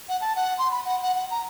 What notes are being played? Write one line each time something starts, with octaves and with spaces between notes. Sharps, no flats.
F#5
A5
F#5
C6
B5
F#5
F#5
F#5
A#5